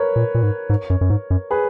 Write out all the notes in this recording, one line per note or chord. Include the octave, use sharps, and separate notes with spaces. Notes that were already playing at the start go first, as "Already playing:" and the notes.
Already playing: A#4 B4 C#5
A#2
A#2
G#2
G#2
F#2
F#2
G#2
F#2
G#4 B4